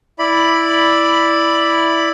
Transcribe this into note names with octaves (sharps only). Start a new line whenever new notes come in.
E4 D5 B5